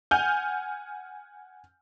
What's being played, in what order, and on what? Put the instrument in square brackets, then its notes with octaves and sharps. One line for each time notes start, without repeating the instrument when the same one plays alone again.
[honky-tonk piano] F#5 G#5 F6 G6